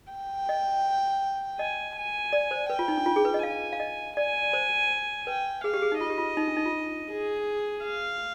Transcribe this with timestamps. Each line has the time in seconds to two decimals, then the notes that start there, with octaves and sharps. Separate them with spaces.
0.12 G5
0.49 D#5
1.59 D#5 G#5
1.96 G#5
2.33 D5
2.51 C5
2.70 B4 G5
2.79 F4
2.88 D#4
2.97 D4
3.06 F4
3.16 G#4
3.25 B4
3.34 D#5
3.43 F5 G#5
3.73 F5
3.80 D#5
4.17 D5 G#5
4.53 C5
5.27 B4 G5
5.64 G#4 F5
5.74 G4
5.82 G#4
5.92 D#4
6.01 F4 D#5
6.10 G4
6.18 F4
6.37 D#4
6.47 D4
6.56 D#4
6.66 F4
7.12 G#4
7.85 F5